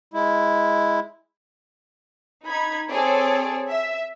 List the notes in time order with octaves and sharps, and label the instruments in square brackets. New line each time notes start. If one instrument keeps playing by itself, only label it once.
[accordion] G#3 E4
[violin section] D#4 B5 G#6
C4 G#4 A4 C#5 D5
E5